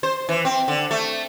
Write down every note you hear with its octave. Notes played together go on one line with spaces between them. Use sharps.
C5
E3
C4
D3
A3